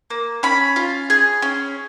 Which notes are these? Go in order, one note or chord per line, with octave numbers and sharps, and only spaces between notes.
A#3
C#4 B5
F4
G#4
C#4